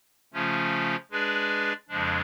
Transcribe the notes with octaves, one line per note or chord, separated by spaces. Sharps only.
C#3 F3 A3 C#4 F4
G#3 D4 G#4 B4 D5
F2 C#3 F3 G#3 D4